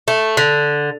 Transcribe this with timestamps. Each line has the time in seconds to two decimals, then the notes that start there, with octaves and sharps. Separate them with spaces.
0.08 A3
0.37 D3